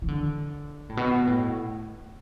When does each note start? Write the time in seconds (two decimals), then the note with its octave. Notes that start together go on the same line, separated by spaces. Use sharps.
0.02 E3
0.08 D3
0.89 A2
0.97 B2
1.27 A2